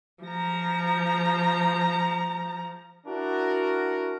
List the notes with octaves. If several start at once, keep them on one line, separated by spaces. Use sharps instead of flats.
F3 A#5
D4 E4 F#4 A#4